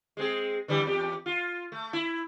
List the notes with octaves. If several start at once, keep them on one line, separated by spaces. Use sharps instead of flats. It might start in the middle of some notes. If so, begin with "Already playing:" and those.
G#3 C4 G#4
D3 E3 G3
E2 G4
F4
A3
E4